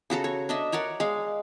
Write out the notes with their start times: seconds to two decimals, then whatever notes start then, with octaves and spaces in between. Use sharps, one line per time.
0.10 C#3 F#4 A4 A#5
0.24 C#5
0.49 D4 D#5 E5
0.72 A#4 C#5 D5 F#5
1.00 G#3 F5